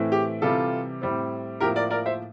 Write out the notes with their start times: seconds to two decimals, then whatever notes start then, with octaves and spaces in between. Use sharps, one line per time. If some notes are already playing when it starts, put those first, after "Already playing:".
Already playing: A2 E3 A3 C4
0.12 G4
0.42 C3 E3 G3 F4 A4
1.02 A2 G3 C4
1.60 A2 F3 A#3 G4 A#4
1.76 A#4 D5
1.90 A#4 D5
2.06 C5 E5